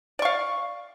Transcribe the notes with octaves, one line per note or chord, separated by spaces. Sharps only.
D5 F5 C#6